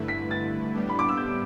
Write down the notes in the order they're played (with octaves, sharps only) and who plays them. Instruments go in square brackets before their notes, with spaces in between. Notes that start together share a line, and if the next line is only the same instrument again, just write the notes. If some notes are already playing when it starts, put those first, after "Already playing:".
Already playing: [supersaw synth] G2 D3 A3 E4 B4
[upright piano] B6
A6
[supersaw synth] A2 G3 B3 D4 G4
[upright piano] B5
D6
E6
G6